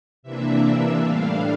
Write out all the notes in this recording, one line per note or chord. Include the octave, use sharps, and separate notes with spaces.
C3 E3 A#3 D4 E5
E5
A2 G3 D4 F5